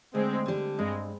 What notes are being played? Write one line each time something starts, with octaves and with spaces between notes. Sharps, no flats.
D2 G#3 C4
D3 G3 D4
G2 G#3 C4